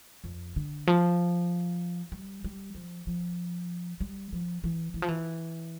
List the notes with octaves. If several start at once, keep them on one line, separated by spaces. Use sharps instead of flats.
F2
D3
F3
G3
G3
F3
F3
G3
F3
E3
E3
F3
E3